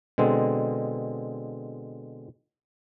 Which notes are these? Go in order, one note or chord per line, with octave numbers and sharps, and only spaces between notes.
B2 D3 G#3 C4